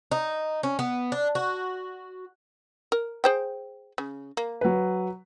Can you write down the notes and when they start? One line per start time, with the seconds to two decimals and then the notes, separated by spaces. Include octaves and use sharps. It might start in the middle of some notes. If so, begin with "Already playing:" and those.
0.11 D#4
0.63 C#4
0.79 B3
1.12 D4
1.35 F#4
2.92 A#4
3.24 G#4 C5 G5
3.98 C#3
4.37 A#3
4.61 F#3 B4